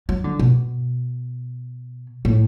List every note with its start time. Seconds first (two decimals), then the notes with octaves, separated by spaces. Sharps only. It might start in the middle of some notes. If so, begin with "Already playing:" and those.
0.09 F#3
0.24 D3
0.39 B2
2.25 A2